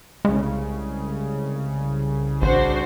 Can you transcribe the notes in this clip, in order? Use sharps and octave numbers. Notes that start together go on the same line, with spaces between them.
C2 C#3 G#3
A1 D4 F#4 C5